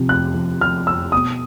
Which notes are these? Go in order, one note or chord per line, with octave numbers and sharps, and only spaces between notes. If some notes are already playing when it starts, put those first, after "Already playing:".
Already playing: C3 F3
F2 F#6
F3
F3 F6
F2 E6
B2 D#6